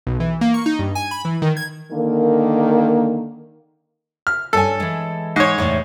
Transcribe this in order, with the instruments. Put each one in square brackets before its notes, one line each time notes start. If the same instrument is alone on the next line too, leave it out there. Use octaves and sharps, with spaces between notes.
[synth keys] B1
E3
A#3
C#6
D#4
G2
G#5
B5
E3
D#3
G#6
[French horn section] D3 D#3 A#3
[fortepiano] F6
[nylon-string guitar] G2 C#4 G#5 [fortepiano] A4
[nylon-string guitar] E3 G#3
[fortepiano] G#2 C#5
[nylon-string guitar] E2 A2 C3